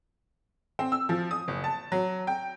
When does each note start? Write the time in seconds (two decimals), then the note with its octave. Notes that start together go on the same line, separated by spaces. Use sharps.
0.79 C4
0.92 E6
1.09 F3
1.31 D#6
1.48 F#1
1.64 A5
1.92 F#3
2.27 G5